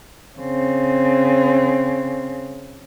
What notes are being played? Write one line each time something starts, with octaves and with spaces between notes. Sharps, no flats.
C#3 C4